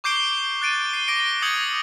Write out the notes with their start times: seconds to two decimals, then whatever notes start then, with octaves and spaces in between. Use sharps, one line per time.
0.04 C#6 D6 G6 C7 D7 G7
0.62 F#6 A6 D7 D#7
0.89 C7 G7
1.08 D6 A#6 D7 G7
1.42 D#6 G6 G#6 A#6 C#7 F#7